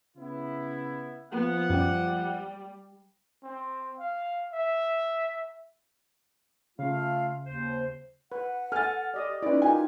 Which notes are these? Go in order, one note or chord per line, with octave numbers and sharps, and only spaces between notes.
C#3 B3 E4
F3 B3 F#5
F#2 G3
C4
F5
E5
C#3 A3 F4 F5
D#2 C5
B4 F#5
A4 G#5 F6 A6
G4 D5 D#5 D#6
C#4 D#4 E4 B4 D5
F4 G4 A#4 G#5